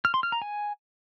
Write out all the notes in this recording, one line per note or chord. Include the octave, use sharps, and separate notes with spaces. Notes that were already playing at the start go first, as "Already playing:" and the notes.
F6
C6
F6
A#5
G#5